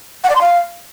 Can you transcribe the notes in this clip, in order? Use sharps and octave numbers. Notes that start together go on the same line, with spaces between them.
F#5
D5
C6
F5